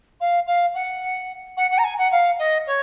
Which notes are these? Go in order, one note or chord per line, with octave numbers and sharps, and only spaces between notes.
F5
F5
F#5
F#5
F#5
A#5
G#5
F#5
F5
D#5
C#5